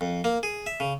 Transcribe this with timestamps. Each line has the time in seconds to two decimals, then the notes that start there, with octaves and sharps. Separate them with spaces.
0.01 F2
0.24 A#3
0.43 G#4
0.66 E5
0.80 C#3